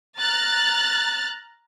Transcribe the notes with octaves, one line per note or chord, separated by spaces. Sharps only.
A#5 F6 F#6 A6